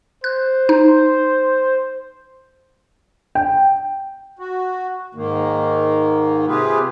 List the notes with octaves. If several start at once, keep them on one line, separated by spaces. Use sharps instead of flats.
C5 F#6
D#4
G5
F#4
G#2 D#3 A#3
C3 F4 G4 G#4 B4